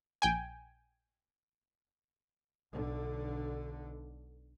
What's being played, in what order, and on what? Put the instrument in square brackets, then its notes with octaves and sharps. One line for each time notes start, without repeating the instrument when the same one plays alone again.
[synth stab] A#1 G5 G#5
[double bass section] B1 D3